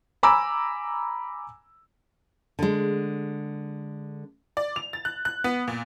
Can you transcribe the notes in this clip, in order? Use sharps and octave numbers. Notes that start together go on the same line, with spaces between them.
G#5 A#5 B5 D6 E6
D3 G#3
D5
F7
A6
F#6
F#6
B3
A#2